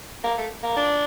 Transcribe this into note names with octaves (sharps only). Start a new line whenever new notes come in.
A#3
A3
A#3
D4